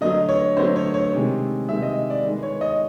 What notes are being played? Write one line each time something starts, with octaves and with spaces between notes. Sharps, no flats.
D3 F#3 A3 D#5
C#5
D3 F#3 A3 C5
C#5
C#5
C3 D#3 G#3
C3 D#3 G#3 E5
D#5
D5
D#3 G#3 B3
C#5
D#5